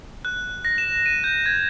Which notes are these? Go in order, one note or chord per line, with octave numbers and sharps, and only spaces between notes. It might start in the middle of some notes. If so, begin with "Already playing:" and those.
F#6
A#6
E7
D#7
G6
G#6